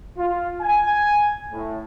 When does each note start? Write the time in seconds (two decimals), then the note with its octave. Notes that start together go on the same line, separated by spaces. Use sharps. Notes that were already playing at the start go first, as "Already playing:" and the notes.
0.18 F4
0.62 G#5
1.52 A2